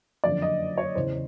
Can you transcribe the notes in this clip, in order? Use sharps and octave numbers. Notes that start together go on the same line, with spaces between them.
F#1 F2 D3 D5
D#5
C#5
E2 C#3 E3 C5